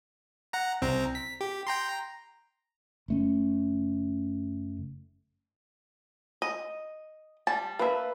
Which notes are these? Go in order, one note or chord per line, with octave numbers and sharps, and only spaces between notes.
F#5 A#5
C2 C4 A#5
B6
G4
G5 A#5 C6
A#5
F#1 A3 C#4
D#5
G3 A5
A#3 B4 E5 A5 B5